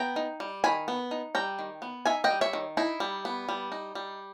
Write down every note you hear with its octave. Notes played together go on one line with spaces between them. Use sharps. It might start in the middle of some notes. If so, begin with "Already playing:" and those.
Already playing: B3 G5 A#5
D#4
G3
D#3 G#5 B5
B3
D#4
G3 G5 A#5
D#3
B3
D#4 E5 G#5
D#5 G5
G3
C#5 E5
D#3
D#4 E4
G3
B3
G3
D#4
G3